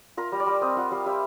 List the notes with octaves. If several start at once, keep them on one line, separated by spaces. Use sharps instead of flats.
F4 A#4
G3
D5
G3
C4 D#5
F4 F#5
G3 F5
G3 E5